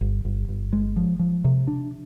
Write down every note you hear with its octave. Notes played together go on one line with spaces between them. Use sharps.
G1
G1
G1
G#3
F3
F3
C3
D4